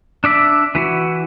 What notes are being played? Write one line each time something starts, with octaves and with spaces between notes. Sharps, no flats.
D4 D5 E5 D6
E3 E4 F#4